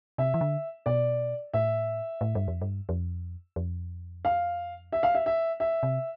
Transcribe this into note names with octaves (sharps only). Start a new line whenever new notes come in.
C3 E5
E3
D3
B2 D5
A2 E5
A2
G2
F2
G2
F2
F2
F5
E5
F5
E5
E5
E5
C3